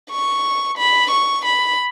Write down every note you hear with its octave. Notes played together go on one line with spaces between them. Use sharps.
C#6
B5
C#6
B5